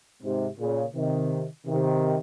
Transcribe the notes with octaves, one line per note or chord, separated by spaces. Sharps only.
G#2 C3
A#2 C#3
C3 D#3
C3 D#3